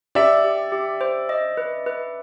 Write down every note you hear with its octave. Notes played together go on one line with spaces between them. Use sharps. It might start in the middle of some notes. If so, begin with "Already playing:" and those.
G4 D5 E5
G4
G4
C5
D#5
B4
B4